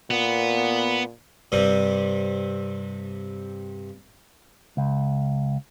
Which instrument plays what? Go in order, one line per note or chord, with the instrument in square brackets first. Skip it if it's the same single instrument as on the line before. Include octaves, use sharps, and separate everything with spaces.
[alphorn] A#2 [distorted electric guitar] B3
[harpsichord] G2 C3 G3 C4
[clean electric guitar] C#2